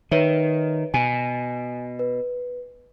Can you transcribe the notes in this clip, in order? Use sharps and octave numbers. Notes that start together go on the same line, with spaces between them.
D#3 B4 C#5 E5
B2 G#5
B4